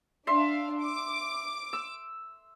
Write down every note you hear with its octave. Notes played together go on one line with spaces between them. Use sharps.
D4 E5 F5 C6
D6
E6